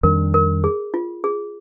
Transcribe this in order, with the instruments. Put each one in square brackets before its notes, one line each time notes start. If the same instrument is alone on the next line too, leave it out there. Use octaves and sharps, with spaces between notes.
[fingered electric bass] F2 D#3 G3 D4 [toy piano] A#4
[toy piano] A#4
G#4
F4
G#4